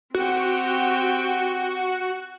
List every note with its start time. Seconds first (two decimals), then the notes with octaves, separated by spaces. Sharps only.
0.15 C4 F#4 G4 G5